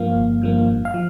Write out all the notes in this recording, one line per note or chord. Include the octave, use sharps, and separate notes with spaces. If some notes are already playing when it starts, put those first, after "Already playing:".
Already playing: G2 F3 A#3 F5
G1
G2 F3 A#3
G2
F5
F3